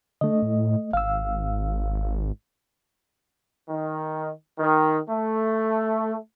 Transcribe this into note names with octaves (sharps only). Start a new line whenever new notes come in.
D3 A3 D#5
A2
G#1 F5 E6
D#3
D#3
A3